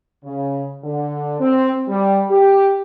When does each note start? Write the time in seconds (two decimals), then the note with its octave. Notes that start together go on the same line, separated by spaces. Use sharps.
0.24 C#3
0.84 D3
1.39 C4
1.88 G3
2.30 G4